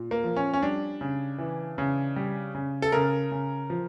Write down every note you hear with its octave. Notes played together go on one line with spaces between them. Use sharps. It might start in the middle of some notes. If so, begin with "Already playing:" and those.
Already playing: A#2
A#3
F3
C#4
C#4
G3 D4
C#3
E3
C#3
G3
C#3
A4
C#3 A#4
C#3
F3